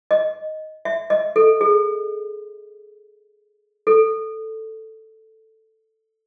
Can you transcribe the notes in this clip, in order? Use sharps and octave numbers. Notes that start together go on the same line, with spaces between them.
D#5
E5
D#5
A4
G#4
A4